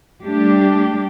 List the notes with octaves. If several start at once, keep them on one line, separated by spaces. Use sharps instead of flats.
G3 A3 D4 G4